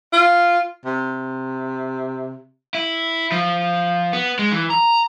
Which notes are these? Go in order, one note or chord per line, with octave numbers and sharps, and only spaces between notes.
F4
C3
E4
F3
B3
G#3
E3
A#5